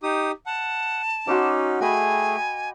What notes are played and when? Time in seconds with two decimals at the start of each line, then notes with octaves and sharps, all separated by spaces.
0.03 D#4 G4 D#6
0.46 F#5 A5
1.27 C#4 D#4 F#4 C6 D6
1.81 A3 G#4 D#5 G5 G#5 B5